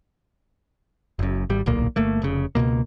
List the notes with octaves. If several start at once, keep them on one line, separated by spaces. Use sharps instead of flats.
F#1 F#2
G#1 G3
D1 B1 A#2 A#3
G1 A3 A#3
F1 C#3
C#2 G#2 B2 A#3